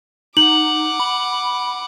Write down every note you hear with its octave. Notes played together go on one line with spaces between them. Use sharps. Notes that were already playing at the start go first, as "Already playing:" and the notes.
D#4 F#5 D6 F#7
B5